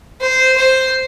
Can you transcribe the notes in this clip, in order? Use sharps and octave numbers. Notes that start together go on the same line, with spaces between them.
C5
C5